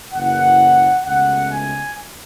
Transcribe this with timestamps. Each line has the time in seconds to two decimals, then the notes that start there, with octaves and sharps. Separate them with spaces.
0.12 F#1 F#2 E3 F#5
1.03 C#2 B2 A3 F#5
1.50 G#5